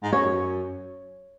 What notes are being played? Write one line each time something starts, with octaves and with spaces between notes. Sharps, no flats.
G#2
F#2 C#5